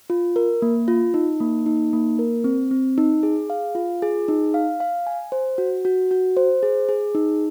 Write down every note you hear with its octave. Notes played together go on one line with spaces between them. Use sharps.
F4
A#4
A#3
F4
D#4
A#3
D#4
A#3
A#4
C4
C4
D#4
G#4
F5
F4
G#4
D#4
F5
F5
G#5
C5
F#4
F#4
F#4
C5
G#4
G#4
D#4